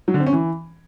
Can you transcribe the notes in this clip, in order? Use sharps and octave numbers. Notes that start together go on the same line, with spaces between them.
F#3
D3
C4
C#4
E3